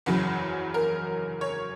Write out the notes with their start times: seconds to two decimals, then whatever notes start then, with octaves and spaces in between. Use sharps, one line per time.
0.06 F#1 E2 C#3 F#3
0.74 A#4
1.41 C#5